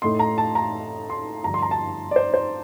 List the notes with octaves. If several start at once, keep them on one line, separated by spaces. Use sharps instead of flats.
A2 A3 D#4 C6
A#5
A5
A#5
C6
G2 D3 F3 A#5
C6
A#5
A5
D5
C5
C5